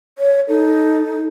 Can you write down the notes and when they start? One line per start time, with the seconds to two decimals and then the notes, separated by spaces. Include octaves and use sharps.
0.18 C#5
0.49 D#4 A4